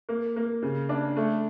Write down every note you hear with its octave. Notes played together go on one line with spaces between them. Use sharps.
A#3
A#3
C#3
D4
A3